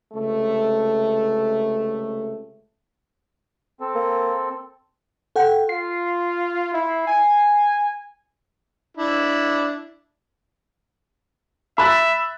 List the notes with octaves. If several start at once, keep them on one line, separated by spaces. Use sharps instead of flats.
C#2 C3 A3
C4 A4
A#3
A4 F#5 G5
F4 C7
E4
G#5
D4 E4
E5 B5 F#6 A6